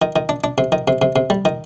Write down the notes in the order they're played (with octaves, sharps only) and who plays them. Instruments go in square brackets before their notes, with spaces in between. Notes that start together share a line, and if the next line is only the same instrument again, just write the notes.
[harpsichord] D#3
D#3
D4
D4
C3
D#3
C3
C3
C3
G3
D#3